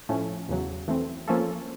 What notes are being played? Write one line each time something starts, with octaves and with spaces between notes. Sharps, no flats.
A2 F3 A3 C#4
E2 C#3 F#3
E3 A3 C4
F3 A#3 C#4 F4 A4